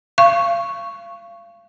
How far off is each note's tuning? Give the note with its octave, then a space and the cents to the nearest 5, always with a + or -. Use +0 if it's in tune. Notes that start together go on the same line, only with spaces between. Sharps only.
F5 -30 C#6 +0